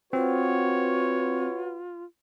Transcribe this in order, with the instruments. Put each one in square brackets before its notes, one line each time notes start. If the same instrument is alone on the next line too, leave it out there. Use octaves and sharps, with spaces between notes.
[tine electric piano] C4 [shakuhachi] F4 [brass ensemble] F#4 B4 [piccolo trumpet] C#5